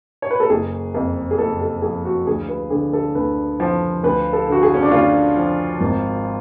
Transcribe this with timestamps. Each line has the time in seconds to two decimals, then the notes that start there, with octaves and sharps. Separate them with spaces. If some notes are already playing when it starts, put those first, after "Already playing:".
0.22 C#5
0.31 B4
0.40 A4
0.50 F#1 G#4
0.94 F2
1.31 G#4
1.38 F#1 A4
1.60 A4
1.82 F3 G#4
2.05 F#4
2.27 D2 G#4
2.49 B4
2.70 D3 G#4
2.93 A4
3.15 D2 B4
3.60 F3
4.03 D2 B4
4.33 A4
4.48 D3 F#4
4.63 G#4
4.74 C#4
4.82 D4
4.91 D2 F4
5.37 F3
5.80 G#1